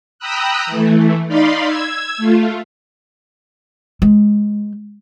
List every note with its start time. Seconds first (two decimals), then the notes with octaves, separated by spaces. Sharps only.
0.19 G5 A#5 B5 D#6 E6 F#6
0.67 E3 A3
1.28 D#4 D5 F5 B5 C6
1.68 E6 G#6
2.18 A3 F4
4.02 G#3